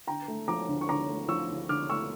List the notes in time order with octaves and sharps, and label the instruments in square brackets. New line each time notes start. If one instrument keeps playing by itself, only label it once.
[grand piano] D3 G5 A#5
A3
F3 A#5 D6
D2
C#6
D3 A#5 D6
A3
F3 C#6 E6
D2
D3 D6 F6
A3 C#6 E6